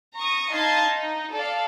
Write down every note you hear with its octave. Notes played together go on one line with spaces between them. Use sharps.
A#5 C#6 D#6
D#4 D#5 F5 A5 C6 G#6
D#4
A4 D5 F5